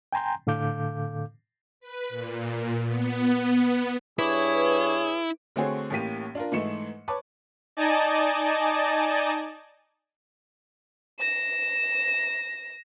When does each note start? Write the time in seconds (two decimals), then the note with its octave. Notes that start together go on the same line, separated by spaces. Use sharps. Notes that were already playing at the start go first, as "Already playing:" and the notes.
0.12 G5 G#5 A#5 C6 G6
0.47 A2 D3 A4 F5 D6 G6
1.80 B4
2.09 A#2
2.87 B3
4.19 G2 E4 G#4 B4 C#5 D6
5.56 D3 A3 C4 F#4 G#4 C#5
5.90 A1 A2 A#3 G4 B6 D#7
6.35 D4 F4 A#4
6.52 G#2 E3 A3 D#4 C#7 E7
7.08 B4 C#5 A5 D6
7.77 D#4 D5 D#5 G#5 A5
11.19 A#6 E7